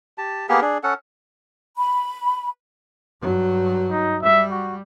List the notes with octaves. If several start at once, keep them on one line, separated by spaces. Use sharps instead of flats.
G4 A5
A#3 B3 G4 G#4
D4 G#4
C#4 A4 F#5
B5
G2 F#3
D#4
G3 E5
F#4